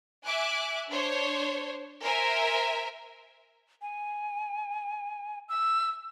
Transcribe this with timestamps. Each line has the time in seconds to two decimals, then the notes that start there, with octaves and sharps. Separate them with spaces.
0.25 E5 G#5 D6 F#6
0.89 D4 C5 C#5
2.02 A#4 C5 E5 G#5
3.82 G#5
5.49 E6